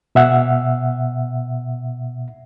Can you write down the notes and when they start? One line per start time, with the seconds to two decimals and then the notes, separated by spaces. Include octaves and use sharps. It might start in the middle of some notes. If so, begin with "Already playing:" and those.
0.15 B2 E5 F#5